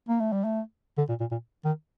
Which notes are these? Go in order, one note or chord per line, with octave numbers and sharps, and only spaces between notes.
A#3
A3
G3
A3
D3
A#2
A#2
A#2
D#3